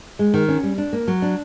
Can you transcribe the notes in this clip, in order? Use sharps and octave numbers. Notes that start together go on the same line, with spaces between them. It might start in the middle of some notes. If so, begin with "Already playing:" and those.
G#3
D#3
C#4
G3
D4
A#3
F#3
D4